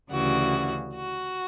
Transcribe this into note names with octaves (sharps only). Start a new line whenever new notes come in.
D2 C#3 E3 G3 F#4
F#4